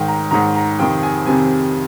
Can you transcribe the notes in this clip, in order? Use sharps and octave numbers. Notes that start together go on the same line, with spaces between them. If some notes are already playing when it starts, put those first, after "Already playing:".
Already playing: G#2 D#3 G5
A#5
G#2 D#3 A#5
A#5
F2 C3 D#3 G5
G#5
F2 C3 D#3 G#5